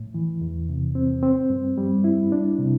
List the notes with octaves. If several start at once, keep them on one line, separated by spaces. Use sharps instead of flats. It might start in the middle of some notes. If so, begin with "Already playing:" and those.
Already playing: A2
E3
E2
C3
C4
C4
G2
G3
E4
D4
C3